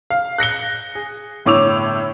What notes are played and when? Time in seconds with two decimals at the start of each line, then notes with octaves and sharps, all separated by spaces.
0.10 F5
0.38 F#6 A#6 C#7 G7
0.95 G#4
1.46 G1 A2 C#5 D6 E6 F7